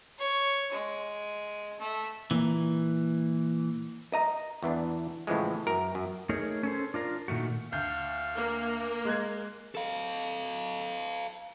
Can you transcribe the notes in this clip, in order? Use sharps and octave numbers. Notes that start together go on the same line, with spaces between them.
C#5
G#3
A3
A#2 E3
D#5 A#5
E2 E3 B3 D4
A2 C#3 E3 F3 G#3
F#2 A#4
F#2
A3 D#4 G#4 A#4 C#5
C#4 A4 C5
D4 F4 A#4
A#2 D#3 A3 F#4
D2 F5 G6
A#3
G#3 F#6 G#6
A4 F5